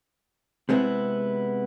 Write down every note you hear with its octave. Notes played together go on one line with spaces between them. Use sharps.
C3 G#3 B3 C4 E4